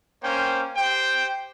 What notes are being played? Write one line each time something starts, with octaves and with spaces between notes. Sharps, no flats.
A#3 C#4 C5 G5
G4 C5 G5